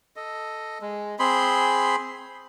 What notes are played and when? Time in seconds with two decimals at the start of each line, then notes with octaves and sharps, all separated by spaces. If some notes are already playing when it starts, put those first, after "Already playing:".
0.16 A4 D#5
0.82 G#3
1.19 C4 G#4 B5 C6